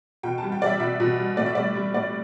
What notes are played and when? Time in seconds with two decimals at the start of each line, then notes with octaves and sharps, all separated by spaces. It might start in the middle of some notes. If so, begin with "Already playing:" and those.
0.23 B2 G5
0.38 G3 A5
0.52 G5
0.61 G3 D5
0.66 E5
0.80 B2 E5
1.00 B2
1.18 G3
1.37 A2 D5
1.46 E5
1.55 G3 D5
1.75 G3
1.94 A2 D5